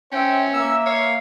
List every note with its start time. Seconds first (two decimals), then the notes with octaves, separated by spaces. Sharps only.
0.12 C#4 C5 E5 G5
0.54 A#3 E5 E6
0.86 C#5 F5